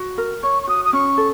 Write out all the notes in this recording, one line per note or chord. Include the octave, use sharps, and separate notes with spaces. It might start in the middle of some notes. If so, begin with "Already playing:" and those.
Already playing: F#4
A#4
C#5 C#6
C#6
F#4 D#6
D#6
C#4 C#6
A4